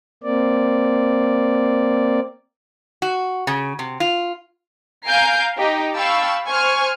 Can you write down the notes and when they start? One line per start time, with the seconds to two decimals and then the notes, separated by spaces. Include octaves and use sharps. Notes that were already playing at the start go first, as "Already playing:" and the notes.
0.23 A#3 C4 D5
3.02 F#4
3.47 C#3
3.79 C3
4.00 F4
5.06 F5 G#5 A#5 G6 C7 D7
5.58 D#4 G4 G5
5.94 F5 G5 A5 B5 C#6 E6
6.47 C5 G#5 C#6 F6 G#6